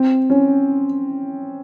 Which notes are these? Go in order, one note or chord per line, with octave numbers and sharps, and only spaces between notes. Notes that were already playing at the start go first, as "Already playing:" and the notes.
Already playing: C4
C#4